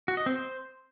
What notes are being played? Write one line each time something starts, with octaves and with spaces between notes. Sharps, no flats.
F#4
D#5
C4
C5